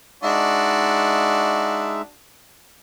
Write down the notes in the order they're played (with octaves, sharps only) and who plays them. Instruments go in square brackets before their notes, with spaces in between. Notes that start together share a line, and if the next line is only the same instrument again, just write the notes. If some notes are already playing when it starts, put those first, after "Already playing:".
[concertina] G#3 D#4 E5 [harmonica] D4 F#4